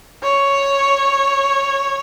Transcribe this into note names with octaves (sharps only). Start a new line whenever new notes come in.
C#5